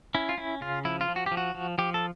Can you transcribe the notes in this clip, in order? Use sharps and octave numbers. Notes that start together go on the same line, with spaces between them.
C#4 E4
F4
C#4 E4
C#3 F4
F3 E4
F4
F3
F#4
G4
F3
F#4
F3
F3 G4
A4